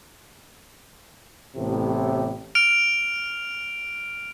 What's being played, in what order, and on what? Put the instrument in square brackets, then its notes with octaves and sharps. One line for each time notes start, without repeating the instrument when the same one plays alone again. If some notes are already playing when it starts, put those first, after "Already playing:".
[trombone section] A1 A2 C3 B3 G4
[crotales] F6 D7 F7